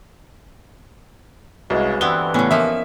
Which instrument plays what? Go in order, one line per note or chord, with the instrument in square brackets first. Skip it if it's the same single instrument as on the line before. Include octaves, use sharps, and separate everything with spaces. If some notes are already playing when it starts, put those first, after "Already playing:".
[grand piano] C2 [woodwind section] C#3 G#3 [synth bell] F#4 B4 D#5
[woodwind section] G2 D3 E3 [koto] B3 C4 E4 [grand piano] G7
[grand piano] A2 [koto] C#3 C#4 [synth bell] B3
[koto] F3 A#3 D#4 [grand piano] E5